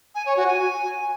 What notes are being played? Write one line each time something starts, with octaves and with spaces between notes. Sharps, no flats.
G#5
C#5
F#4
G#5